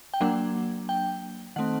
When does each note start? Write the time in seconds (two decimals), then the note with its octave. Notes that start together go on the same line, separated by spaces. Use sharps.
0.14 G5
0.21 F#3 A#3 D4 F#5
0.89 G5
1.56 D#3 A3 C4 F#5